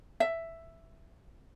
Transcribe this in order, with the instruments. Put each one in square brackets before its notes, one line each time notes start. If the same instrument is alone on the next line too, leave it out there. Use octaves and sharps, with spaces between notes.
[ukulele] E5